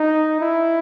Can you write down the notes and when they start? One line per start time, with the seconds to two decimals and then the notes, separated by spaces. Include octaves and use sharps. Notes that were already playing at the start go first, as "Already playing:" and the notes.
Already playing: D#4
0.41 E4